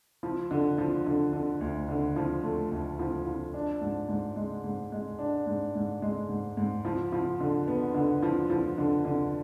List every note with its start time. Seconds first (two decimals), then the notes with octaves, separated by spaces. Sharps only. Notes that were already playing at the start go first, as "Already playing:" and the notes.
0.23 F3
0.51 D3
0.78 F3
1.07 D3
1.33 D3
1.61 D2
1.89 D3
2.16 F3
2.43 A3
2.71 D2
2.99 F3
3.26 F3
3.54 D4
3.81 G#2
4.09 G#2
4.36 G#3
4.64 G#2
4.92 G#3
5.19 D4
5.46 G#2
5.75 G#2
6.02 G#3
6.29 G#2
6.57 G#2
6.85 F3
7.12 F3
7.40 D3
7.68 B3
7.94 D3
8.22 F3
8.50 F3
8.78 D3
9.05 D3